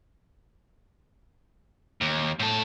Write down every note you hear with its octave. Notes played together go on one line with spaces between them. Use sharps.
D#2
A2 A4